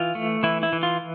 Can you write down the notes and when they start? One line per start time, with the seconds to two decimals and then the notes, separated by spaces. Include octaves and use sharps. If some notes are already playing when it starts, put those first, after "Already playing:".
Already playing: E3 F4
0.15 A3
0.43 E3 E4
0.63 E4
0.73 E3
0.83 F4